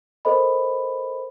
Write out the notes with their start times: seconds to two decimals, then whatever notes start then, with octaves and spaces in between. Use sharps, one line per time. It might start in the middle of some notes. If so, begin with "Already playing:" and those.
0.25 A4 A#4 C5 D#5 B5